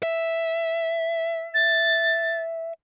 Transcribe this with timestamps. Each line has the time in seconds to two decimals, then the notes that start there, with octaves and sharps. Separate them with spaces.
0.03 E5
1.54 A6